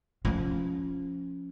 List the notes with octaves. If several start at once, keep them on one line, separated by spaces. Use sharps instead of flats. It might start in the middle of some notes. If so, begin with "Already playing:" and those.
F3 C#4